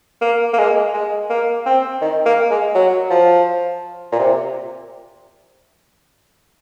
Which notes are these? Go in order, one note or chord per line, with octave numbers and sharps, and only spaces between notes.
A#3
A#3
G#3
G#3
A#3
C4
D#3
A#3
G#3
F#3
F3
A#2
C3